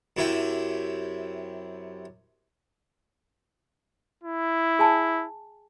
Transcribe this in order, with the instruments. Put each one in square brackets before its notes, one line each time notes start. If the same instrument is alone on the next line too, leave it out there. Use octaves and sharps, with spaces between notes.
[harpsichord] F#2 C3 E4 G4 E5
[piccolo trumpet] E4
[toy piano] G#4 G#5 A5